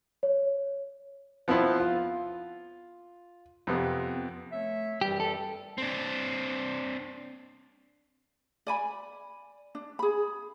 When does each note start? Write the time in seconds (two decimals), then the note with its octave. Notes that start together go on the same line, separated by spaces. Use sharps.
0.23 C#5
1.48 F3 B3 C4 E4 B4 C5
1.80 F4
3.67 F2 C3 B3
4.52 A3 C#5 E5
5.01 F#2 E3 G3 G4
5.20 A4
5.78 C4 D4
8.67 D5 G#5 B5
9.75 D4
9.99 G#4 B5